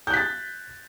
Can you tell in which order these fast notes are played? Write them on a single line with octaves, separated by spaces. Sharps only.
G6 F#6 B6 A6